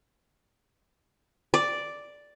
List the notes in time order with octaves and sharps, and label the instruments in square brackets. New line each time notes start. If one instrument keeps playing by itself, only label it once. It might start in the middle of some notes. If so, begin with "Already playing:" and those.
[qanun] D5